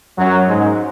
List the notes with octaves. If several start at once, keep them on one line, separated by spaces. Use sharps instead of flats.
F#2 F#3
G#2 G#3